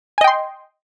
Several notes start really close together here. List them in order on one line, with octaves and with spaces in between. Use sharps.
G#5 D#5 G5 C6